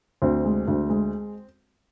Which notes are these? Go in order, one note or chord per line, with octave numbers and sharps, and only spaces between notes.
D2 C4
G#3
D2
G#3